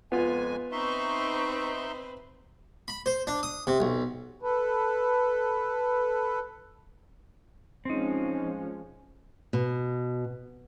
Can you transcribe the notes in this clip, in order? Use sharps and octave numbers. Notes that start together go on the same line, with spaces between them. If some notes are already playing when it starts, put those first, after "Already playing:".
F2 G#3 B3 F4 G#5
C4 D#4 B4 E5 C6 C#6
B5
C5
D4
D#6
C3
B1
A4 B4
F3 G#3 C4 C#4 D#4
B2